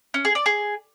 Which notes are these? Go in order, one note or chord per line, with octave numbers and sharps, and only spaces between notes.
C#4
G#4
D5
G#4